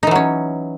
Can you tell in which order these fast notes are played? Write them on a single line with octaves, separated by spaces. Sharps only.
D#4 E3 F#3 C#4